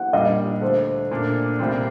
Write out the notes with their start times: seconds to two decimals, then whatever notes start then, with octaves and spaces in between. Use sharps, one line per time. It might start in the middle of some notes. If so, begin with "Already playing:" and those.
Already playing: F#5
0.13 A#2 G3 D4 D#5
0.61 D2 D3 A3 D4 C5
1.11 A#2 A3 D4
1.59 C2 A#2 G3 C4